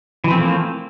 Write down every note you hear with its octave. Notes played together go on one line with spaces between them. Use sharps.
E3 F3 A3 A#3 C4